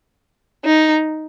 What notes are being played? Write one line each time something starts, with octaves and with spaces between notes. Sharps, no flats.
D#4